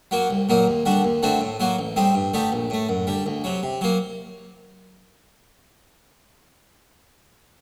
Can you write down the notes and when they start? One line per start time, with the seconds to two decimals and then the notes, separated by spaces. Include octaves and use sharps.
0.11 F#3 A#3 F#4
0.30 C2
0.49 A#2 F#3 A#3 D#4
0.67 D#2
0.85 D3 G3 D4 F#4
1.04 D#2
1.23 D3 A3 C4 F#4
1.41 A2
1.60 F#3 A#3 F#4
1.79 A1
1.96 A2 G3 C4 D#4
2.15 G2
2.34 D3 A3 D#4 G4
2.52 A#1
2.70 A2 A3
2.89 F#2
3.07 D3 G3
3.26 D2
3.44 C3 F#3
3.63 C3
3.81 F#3 A#3